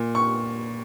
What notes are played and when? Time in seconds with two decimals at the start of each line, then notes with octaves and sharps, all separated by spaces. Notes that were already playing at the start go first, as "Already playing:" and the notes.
Already playing: A#2
0.15 C#6